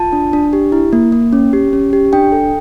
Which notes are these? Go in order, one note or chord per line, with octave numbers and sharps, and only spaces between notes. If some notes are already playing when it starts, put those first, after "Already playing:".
Already playing: F4 A5
D4
D4
G4
E4
A#3
A#3
C#4
G4
C#4
G4
D4 G5
A4